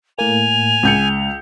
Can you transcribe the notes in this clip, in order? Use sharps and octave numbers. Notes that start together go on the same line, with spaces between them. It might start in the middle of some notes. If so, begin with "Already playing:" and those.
A2 A#3 G#5 F7
C#2 G6 C#7